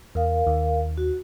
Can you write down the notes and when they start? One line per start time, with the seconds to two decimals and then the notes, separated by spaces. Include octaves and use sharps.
0.15 E2 A#4 F5
0.47 D#2
0.97 F#4